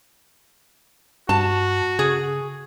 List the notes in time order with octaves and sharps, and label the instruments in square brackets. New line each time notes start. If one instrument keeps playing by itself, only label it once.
[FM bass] G2 [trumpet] F#4 [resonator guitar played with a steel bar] A5
[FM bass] C#3 [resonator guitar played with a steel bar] G#4